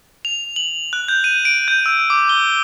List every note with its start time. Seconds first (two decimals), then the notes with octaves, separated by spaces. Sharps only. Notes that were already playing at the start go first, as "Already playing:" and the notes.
0.25 F7
0.56 F#7
0.93 F#6
1.08 G6
1.24 D#7
1.45 D7
1.68 G6
1.86 E6
2.10 D6
2.29 G7